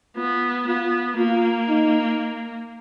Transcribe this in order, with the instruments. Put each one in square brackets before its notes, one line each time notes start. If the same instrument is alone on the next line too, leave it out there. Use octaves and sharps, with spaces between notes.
[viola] B3 [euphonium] F4
[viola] B3 [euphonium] F4
[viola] A#3 [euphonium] F4
[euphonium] D#4